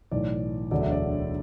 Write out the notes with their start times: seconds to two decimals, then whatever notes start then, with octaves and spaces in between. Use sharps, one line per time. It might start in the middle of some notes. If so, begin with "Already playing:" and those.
0.11 B1 A2 E3 D5
0.71 E1 D2 D3 F#3 D5
0.81 E5
0.92 D5